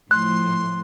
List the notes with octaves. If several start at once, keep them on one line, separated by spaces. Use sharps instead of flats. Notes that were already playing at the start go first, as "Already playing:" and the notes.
A2 F3 C6 F#6